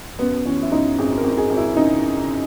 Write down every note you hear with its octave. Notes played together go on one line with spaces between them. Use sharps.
F#2 B3
E3 C#4
E4
F#2 D#4
G#1 G#4
A#4
G#1
G#4
G#1
E4
C#3 D#4